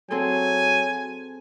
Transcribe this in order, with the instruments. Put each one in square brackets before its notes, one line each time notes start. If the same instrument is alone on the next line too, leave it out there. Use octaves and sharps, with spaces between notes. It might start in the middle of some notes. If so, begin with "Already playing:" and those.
[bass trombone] F#3 [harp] C4 G#4 A4 [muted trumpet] G#5